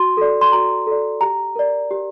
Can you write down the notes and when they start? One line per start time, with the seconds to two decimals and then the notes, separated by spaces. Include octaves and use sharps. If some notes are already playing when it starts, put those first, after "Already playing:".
Already playing: F#4 C6
0.17 A4 D5
0.41 C6
0.52 F#4 A#5
0.87 A4 D5
1.21 G4 A#5
1.56 A#4 D5
1.91 G4